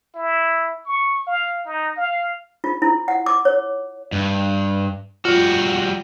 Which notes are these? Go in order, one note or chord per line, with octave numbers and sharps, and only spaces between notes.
E4
C#6
F5
D#4
F5
F4
E4
F#5
D6
C#5
G2
G3 F4 F#4